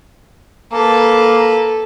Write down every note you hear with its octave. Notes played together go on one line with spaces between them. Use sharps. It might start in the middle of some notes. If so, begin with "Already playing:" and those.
A#3 A4 B4